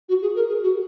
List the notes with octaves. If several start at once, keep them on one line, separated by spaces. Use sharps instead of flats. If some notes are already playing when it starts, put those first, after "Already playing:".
F#4
G#4
A#4
G#4
F#4